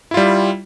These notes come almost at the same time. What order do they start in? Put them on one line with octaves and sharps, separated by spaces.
E4 F4 G3